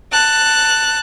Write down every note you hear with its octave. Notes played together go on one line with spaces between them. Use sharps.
A5 F#6